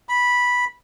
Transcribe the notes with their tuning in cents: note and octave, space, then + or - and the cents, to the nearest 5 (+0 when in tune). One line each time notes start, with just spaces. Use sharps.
B5 -10